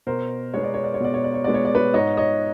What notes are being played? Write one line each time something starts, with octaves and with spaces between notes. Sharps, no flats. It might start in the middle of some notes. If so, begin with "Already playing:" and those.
B2 A#4 C5
G#3 B3 C#5
D5
C#5
D5
C#5
B2 D5
C#5
D5
C#5
G#3 B3 D5
C#5
D5
B4 C#5
G#2 C#5 D#5
C#5 D#5